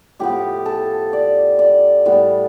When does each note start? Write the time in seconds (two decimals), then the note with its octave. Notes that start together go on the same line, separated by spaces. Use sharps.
0.19 A2 F3 B3 G4
0.66 A4
1.13 D5
1.59 D5
2.05 A2 G3 B3